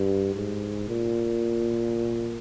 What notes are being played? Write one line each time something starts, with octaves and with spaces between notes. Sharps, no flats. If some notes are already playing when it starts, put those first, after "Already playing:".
Already playing: G2
G#2
A#2